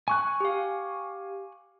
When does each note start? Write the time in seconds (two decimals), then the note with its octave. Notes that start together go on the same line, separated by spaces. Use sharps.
0.08 G#5 C#6 F#6
0.40 G4 F5